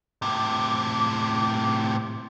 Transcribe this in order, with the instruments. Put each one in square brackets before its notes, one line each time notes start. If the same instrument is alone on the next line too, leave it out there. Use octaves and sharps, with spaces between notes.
[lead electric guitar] A2 C3 [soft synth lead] D6